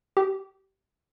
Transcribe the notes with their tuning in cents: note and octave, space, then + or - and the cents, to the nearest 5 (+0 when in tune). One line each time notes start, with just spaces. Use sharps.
G4 -20